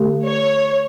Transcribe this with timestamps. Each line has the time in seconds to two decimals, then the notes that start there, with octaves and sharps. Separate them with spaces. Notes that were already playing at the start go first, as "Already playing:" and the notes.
Already playing: D3 A3 G4
0.26 C#5